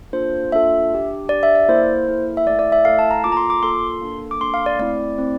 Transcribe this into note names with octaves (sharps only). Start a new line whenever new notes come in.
A#3 D4 F4 A4 C5
A#3 D4 F4 A4 E5
D4 G4
D4 G4 D5
E5
D5
A#3 E4 A4 C5
A#3 E4 A4
E5
A3 E4 A4 D5
D5
E5
A3 E4 A4 F5
A5
A#5
A#3 F4 A4 D6
A#5
C6
D6
A#3 F4 A4 C6
A#3 D4 A4
D6
A#3 D4 A4 C6
F5
D5
A3 C4 E4 D5
A3 C4 E4